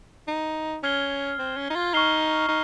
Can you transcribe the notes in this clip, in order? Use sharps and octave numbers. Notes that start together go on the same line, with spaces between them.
D#4
C#4 F6 G#6 C7 G7
C4
C#4
D#4
F4
D#4 C#6 F6 C7 G7
D#4